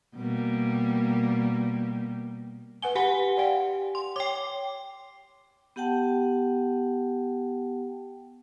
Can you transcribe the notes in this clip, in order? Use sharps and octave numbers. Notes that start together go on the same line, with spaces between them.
B2 G3 A#3
B4 F#5 G#5 G7
G4 F#5 G#5 B5
D5 F5 G5
C6
C#5 G5 D6
B3 G4 F#5 G5 A5